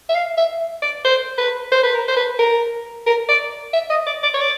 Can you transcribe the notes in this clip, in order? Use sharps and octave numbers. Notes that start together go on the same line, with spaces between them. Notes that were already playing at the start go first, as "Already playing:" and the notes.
E5
F5
E5
D5
C5
B4
C5
B4
A#4
C5
B4
A#4
A#4
D5
E5
D#5
D5
D5
C#5
D5